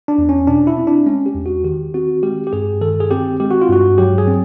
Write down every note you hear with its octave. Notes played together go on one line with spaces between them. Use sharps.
D4
E2
C#4
B2 D4
E4
C4
D4
G#3 C#4
G4
E2
F#4
D#3 G4
C4 F#4
G#3 G4
G4
G2 G#4
D#3 A4
G#4
C4 G4
G#3 G4
F#4
F4
G2 F#4
F#3 G4
G#4
C4